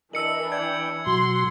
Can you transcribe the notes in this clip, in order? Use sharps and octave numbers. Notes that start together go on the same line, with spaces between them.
E3 D4 A#4 D#5 E6 C#7 F#7
D5 G5 G#6
B2 F#3 F#4 C6